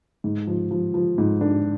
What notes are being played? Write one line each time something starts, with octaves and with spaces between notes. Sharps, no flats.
G#2
F3
F3
F3
G#2
D4